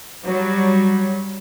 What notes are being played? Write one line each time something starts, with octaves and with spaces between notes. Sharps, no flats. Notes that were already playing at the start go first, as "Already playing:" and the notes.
F#3 G3